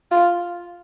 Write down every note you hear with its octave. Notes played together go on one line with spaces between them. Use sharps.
F4